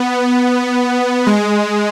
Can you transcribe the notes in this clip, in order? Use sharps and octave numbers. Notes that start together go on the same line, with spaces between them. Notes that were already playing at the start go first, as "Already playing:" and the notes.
Already playing: B3
G#3